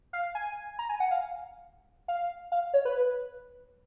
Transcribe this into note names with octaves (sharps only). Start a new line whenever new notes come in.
F5
G#5
A#5
G#5
F#5
F5
F5
F5
C#5
B4